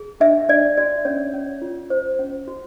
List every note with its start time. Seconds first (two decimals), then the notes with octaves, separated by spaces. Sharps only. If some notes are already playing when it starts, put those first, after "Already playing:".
Already playing: G#4
0.20 D4 E5
0.49 D4 D5
0.77 F#4 D5
1.05 C#4 C#5
1.34 C#4
1.62 F4
1.90 C5
2.19 C#4
2.48 F#4